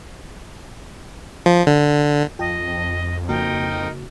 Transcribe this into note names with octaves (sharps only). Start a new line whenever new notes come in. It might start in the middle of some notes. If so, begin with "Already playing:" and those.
F3
D3
F2 F4 D#5 G5 A5
C#3 A#3 D#4 F#4 A#4 G5